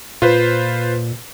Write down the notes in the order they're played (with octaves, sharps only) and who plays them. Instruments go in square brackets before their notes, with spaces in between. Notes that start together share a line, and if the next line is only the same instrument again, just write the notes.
[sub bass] A#2 [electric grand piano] F4 B4 C5